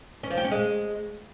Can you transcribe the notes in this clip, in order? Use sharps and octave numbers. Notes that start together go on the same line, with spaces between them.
C#4
F3
G4
C#4
G#3